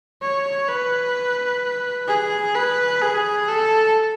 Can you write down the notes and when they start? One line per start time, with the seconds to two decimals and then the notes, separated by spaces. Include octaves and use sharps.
0.22 C#5
0.68 B4
2.08 G#4
2.55 B4
3.02 G#4
3.48 A4